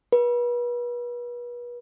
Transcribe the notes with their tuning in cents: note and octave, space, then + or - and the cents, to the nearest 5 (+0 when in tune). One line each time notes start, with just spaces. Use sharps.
B4 -35